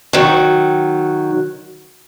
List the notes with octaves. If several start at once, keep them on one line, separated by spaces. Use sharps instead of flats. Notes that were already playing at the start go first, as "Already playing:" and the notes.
D#3 F#3